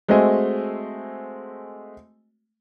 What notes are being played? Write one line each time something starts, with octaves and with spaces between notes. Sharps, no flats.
G#3 A3 C4 F#4 D#5 G#5